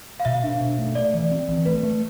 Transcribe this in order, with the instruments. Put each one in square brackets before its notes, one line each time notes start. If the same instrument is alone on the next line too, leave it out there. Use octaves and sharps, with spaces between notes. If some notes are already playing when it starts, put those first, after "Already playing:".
[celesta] F5
[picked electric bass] B2 [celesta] E5
[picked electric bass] D4
B2
A3
[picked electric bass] A3 [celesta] D5
[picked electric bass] E3
C4
E3
[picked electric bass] A3 [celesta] B4
[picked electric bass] A3